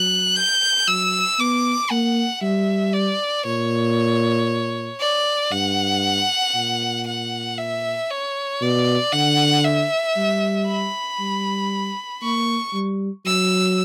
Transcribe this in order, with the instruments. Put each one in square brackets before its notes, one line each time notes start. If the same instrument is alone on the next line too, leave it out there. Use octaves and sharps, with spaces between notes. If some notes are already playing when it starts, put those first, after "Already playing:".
Already playing: [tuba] F#3 [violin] F#6
[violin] G6
[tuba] F#3 [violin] E6
[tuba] B3 [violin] D6
[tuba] A#3 [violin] F#5
[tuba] G3 [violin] E5
[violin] D5
[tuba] A#2 [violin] C#5
[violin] D5
[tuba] G2 [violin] F#5
[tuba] A#2
[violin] F#5
E5
C#5
[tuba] B2 [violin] D5
[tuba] D3 [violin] F#5
[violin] E5
[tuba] G3
[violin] B5
[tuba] G3
[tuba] A#3 [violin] C#6
[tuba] G3
[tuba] F#3 [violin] E6